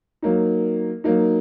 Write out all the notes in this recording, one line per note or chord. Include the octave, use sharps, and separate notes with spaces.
F#3 A#3 D#4
F#3 A#3 D#4